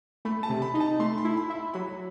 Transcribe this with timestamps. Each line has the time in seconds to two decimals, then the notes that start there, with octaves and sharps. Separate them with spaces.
0.25 A3 B5
0.43 A5
0.49 C3
0.62 B5
0.74 D#4
0.80 A5
0.99 A3 C6
1.18 B5
1.24 E4
1.37 B5
1.50 E4
1.55 B5
1.74 F#3 B5